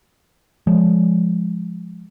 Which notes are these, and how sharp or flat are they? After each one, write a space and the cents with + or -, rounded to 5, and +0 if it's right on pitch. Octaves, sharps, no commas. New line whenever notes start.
F3 +0 G#3 +0